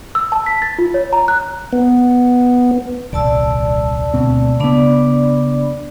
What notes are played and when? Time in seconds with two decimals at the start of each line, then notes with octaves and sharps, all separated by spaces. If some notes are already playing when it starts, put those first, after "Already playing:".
0.15 E6
0.32 A5
0.46 B6
0.62 A6
0.78 F4
0.94 C#5
1.13 A#5
1.28 F#6
1.73 B3
3.13 D#1 C2 D5 A5 E6
4.14 D2 B2 C4
4.60 C#3 B3 D4 D5 B5